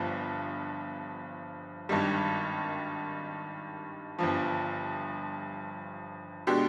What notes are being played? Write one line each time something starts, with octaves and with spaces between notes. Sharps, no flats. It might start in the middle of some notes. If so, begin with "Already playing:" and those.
Already playing: G1 G2 F3 B3
G#1 G2 D#3 G3
G1 G2 F3
B2 G#3 D4 G4